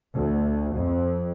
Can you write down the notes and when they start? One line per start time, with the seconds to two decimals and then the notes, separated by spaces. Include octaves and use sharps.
0.13 D2
0.73 F2